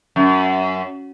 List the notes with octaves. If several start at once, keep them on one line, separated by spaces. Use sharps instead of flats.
F#2